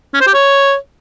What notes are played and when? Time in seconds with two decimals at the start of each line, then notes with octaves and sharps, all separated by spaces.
0.14 C#4
0.21 C5
0.27 G4
0.34 C#5